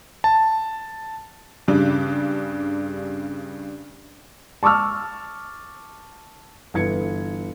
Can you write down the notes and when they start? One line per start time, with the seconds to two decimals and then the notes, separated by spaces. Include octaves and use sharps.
0.24 A5
1.68 G2 C#3 G3 D4
4.63 A5 C#6 D6 E6 F6
6.74 G1 E3 G#6 C#7